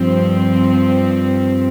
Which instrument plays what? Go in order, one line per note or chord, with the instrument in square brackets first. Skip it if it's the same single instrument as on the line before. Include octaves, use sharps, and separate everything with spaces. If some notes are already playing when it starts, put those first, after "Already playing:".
Already playing: [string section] G2 F3 C4